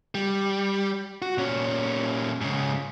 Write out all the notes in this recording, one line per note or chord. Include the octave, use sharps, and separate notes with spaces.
G3
F#4
A#2 C#4
G#2 C#3